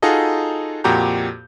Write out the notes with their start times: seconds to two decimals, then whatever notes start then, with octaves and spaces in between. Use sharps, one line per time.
0.02 D#4 F4 F#4 G#4 A4 D#5
0.84 F2 A#2 F#4 G4 A#5 G6